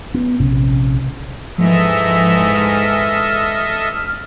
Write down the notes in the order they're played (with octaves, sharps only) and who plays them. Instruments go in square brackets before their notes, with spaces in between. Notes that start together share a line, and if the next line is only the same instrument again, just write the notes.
[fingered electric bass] B3
A#1 C3 C#4
[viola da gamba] G#2 E3 G#3 [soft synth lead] F3 [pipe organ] A4 D#5 E5
[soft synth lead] F6